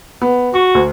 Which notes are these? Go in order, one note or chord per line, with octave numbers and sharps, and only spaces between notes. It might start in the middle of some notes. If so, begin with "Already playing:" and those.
B3
F#4 C#6
D2